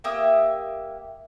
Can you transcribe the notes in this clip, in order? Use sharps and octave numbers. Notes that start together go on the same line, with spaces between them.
A#3 G4 E5 D#6